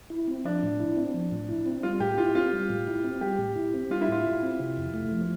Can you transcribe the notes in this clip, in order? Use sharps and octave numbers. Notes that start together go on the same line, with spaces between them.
E4
C4
F3 D4
A2
E4
C4
F3
A2
E4
C4
G3 F4
A2 G4
E4 F4
C4 F4
G3
A2
E4
C4
G3 G4
A2
E4
C4
G3 F4
E4
A2 F4
E4
C4
C3
F2
A3
F3